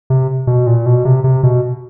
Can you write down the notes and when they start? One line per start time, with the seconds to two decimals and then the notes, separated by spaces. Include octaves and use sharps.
0.10 C3
0.47 B2
0.67 A#2
0.86 B2
1.05 C3
1.24 C3
1.43 B2